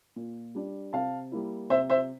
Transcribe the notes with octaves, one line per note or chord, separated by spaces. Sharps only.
A#2
G3 D4
C3 F5 A5
G3 A#3 E4
C3 C5 E5
C5 E5